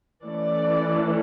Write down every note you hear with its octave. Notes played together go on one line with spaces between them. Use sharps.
E3 A3 C#4 D5